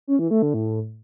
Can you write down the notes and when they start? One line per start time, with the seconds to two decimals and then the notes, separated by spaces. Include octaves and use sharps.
0.07 C#4
0.19 E3
0.31 A3
0.42 D3
0.54 A2